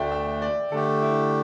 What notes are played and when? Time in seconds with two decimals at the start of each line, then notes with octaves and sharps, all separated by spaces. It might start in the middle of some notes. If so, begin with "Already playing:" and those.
Already playing: D2 D3 A3 D5 E5 G5
0.11 E5
0.42 D5
0.71 D3 A3 G4 A4
1.02 E4